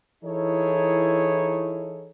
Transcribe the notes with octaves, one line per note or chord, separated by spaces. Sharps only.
E3 D#4 E4 G#4 A4 C#5